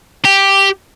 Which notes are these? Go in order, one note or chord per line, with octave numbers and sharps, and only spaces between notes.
G4